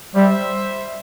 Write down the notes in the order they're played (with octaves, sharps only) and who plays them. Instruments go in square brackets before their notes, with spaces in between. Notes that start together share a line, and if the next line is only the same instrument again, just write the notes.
[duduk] G3 [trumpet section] C5 E5